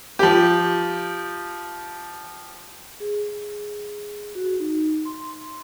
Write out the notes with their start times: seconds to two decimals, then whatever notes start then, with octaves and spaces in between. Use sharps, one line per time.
0.19 F3 G4
3.00 G#4
4.35 F#4
4.60 D#4
5.05 C6